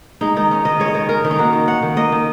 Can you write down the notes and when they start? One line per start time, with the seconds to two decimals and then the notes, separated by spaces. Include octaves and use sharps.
0.21 G#3 D#4
0.36 D#3 D#4
0.51 C#4
0.65 D#3 D#5
0.80 G#3 C#5
0.88 D#5
0.94 D#3 C#5
1.09 C#4 A#4
1.24 D#3 C#4
1.31 D#4
1.38 A#3 F#4
1.53 D#3
1.68 C#4 F#5
1.83 D#3
1.96 A#3 D#5
2.12 D#3